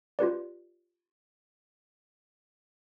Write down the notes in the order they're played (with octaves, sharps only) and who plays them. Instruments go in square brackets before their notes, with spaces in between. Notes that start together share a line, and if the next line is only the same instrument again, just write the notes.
[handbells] F4 G4 B4 D5